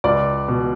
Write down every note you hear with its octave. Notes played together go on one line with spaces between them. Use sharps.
C#2 D5
B2